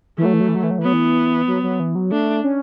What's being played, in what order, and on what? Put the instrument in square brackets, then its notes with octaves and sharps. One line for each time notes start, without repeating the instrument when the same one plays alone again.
[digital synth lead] E3 [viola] A3
[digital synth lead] F#3
E3
F#3
E3
F#3
E3
F#3
E3
[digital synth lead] F#3 [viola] B3
[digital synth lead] E3
F#3
F#3
E3
F#3
[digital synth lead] A3 [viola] D4
[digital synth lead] C#4